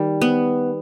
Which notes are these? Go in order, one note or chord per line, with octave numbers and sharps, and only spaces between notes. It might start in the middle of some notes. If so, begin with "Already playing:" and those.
Already playing: D#3 G3
B3